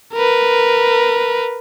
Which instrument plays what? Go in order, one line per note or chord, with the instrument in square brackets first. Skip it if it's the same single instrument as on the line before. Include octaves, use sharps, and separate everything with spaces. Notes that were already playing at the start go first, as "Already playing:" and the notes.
[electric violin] A#4 B4